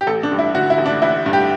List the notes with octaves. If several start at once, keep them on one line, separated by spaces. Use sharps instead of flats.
G4
A1 A4
D4
G2
E4
D3 F#4
E4
A1
D4
A1 E4
G2
G4